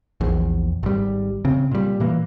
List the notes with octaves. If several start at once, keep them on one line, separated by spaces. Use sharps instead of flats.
A#1 E2
G#1 G3
C#3 C4
A#2 G3
A#2 E3 A#3